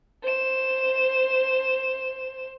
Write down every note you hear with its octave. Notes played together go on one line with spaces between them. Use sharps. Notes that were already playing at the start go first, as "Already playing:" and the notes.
C5 E7